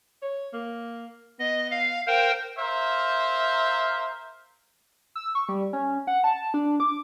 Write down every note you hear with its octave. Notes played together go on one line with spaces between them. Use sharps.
C#5
A#3
B3 D#5
F5
A#4 C5 F5 G5
A#4 C5 E5 F5
E6
C#6
G3
C#4
F#5
A5
D4
D6